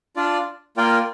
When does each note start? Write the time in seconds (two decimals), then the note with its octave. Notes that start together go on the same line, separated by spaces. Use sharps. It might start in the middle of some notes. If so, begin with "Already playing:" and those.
0.16 D4 F4 D5
0.77 A#3 F4 A#4 D5 G5